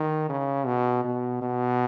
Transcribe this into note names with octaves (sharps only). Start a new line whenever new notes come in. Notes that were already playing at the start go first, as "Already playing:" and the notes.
Already playing: D#3
C#3
B2
B2
B2